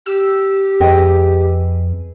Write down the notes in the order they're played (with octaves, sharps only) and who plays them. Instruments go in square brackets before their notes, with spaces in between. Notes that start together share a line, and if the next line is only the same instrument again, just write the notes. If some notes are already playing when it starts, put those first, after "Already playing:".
[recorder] G4 [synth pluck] E6
[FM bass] F2 [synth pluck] G#4 B4 [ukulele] D#5 G5